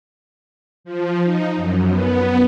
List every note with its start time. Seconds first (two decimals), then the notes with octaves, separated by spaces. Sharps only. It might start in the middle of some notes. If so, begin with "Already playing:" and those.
0.84 F3
1.24 D#4
1.56 F#2
1.89 B3